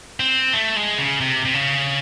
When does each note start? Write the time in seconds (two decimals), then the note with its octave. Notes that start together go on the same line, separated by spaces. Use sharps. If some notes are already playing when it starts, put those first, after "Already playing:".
0.20 C4
0.53 A3
0.76 G#3
0.98 C#3
1.21 C3
1.45 C3
1.54 C#3